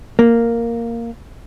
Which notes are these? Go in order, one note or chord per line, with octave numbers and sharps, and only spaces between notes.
A#3